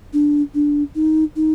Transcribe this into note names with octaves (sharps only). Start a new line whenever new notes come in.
D4
D4
D#4
D#4